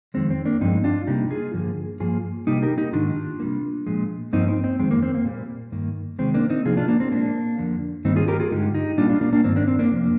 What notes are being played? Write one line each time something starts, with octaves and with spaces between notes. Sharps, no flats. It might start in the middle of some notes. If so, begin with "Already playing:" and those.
F2 D#3 G#3 C4
C4
A#3 D4
G2 F3 G#3 C4 D#4
D4 F4
C3 G3 A#3 D#4 G4
F4 G#4
G2 D3 F3 A#3
G2 F3 A#3 F4 G#4
C3 G3 A#3 D#4 G4
G4 A#4
D#4 G4
G#2 D#3 A#3 D4 F4
C3 G3 A#3
A#2 F3 G#3
G2 F3 A#3 C4 D#4
C4
C4
F2 D#3 G#3 C4
A#3
C4
A#3
A#2 G3 A#3
G2 D#3 A#3
C3 D#3 G#3 C4
A#3 D4
C4 D#4
C3 F3 A#3 F4 G#4
D4 F4
A#3 D4
C4
A#2 G#3 A#3 D4
F2 D3 F3 A#3
G2 D#3 G3 A#3 C4 D#4
F4 G#4
G4 A#4
F4 G#4
G2 D3 G#3 D#4 G4
D#4 G4
A#2 G3 A#3 D4 F4
D4 F4
A#3 D4
A#3 D4
G2 D#3 A#3 C4
A#3 D4
C4
A#3 D4
F2 C3 F3